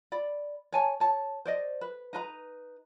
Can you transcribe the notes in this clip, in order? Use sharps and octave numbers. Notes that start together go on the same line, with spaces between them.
D5 B5
C#5 G#5 A5
C#5 A5
C5 D5 D#5
B4
D#4 B4 A#5